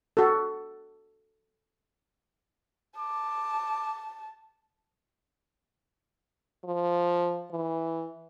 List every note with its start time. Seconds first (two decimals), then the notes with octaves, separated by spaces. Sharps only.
0.17 F#4 A4
2.98 A5 D6
6.65 F3
7.51 E3